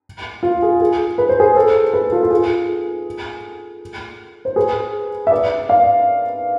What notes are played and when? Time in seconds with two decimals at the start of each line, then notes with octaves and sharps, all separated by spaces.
0.43 F4
0.62 G#4
0.81 G#4
1.18 B4
1.29 C5
1.39 G#4 B4
1.56 A4 C5
1.93 G#4 B4
2.12 F4 A4
2.23 F4
2.30 G#4
4.45 C5
4.56 G#4 B4
5.27 E5
5.31 B4 D5
5.69 D5 F5